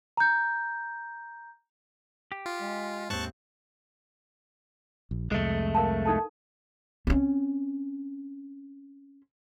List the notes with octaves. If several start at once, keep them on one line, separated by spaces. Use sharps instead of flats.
A#5 G6
G4
F4
G#3
D#2 G#2 C4 A5 C#6 F#6
A#1
C2 F2 G#3 A3
A#4 F5 A5
D#4 A4 A5
C4 C#4